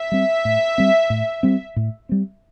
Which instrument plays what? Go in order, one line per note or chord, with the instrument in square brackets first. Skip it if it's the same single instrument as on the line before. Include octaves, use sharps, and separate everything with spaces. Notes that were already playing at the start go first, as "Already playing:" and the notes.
Already playing: [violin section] E5
[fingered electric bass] G3 C4
A2
G3 C4
A2
G3 C4
A2
G3 C4